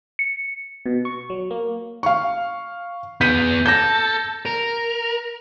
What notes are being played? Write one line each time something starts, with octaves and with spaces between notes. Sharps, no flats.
C#7
B2
C#6
F#3
A#3
F5 C#6
B3 G#4 G6 B6 D#7
A4 G6 A#6
A#4